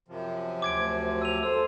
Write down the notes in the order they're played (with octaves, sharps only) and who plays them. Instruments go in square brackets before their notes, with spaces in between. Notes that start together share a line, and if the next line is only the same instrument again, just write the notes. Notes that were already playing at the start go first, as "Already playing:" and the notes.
[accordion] F#2 C3 F3
[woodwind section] D2 [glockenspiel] D6 G#6 D7
[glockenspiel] E6 D#7 F7
[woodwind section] A4 C5 [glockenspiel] E6